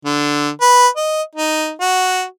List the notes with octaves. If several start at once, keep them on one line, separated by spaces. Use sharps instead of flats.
D3
B4
D#5
D#4
F#4